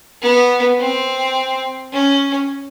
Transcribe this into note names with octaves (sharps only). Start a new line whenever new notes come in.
B3
C4
C#4